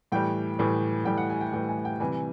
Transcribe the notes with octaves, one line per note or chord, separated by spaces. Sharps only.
A2 E3 G3 G5
A2 E3 G3
A2 E3 G3 G5
F#5
G#5
G5
A2 E3 G3 G5
G#5
G5
C3 E3 G3 G#5